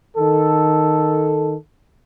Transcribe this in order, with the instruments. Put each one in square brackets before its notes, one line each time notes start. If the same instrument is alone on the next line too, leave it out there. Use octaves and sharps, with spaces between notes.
[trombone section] D#3 A4